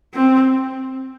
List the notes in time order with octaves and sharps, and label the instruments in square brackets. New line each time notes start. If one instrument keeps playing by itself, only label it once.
[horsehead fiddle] C4